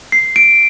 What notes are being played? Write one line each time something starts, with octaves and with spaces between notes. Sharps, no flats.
C7
D7